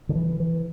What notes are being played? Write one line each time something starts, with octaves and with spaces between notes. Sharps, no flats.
D3
E3
E3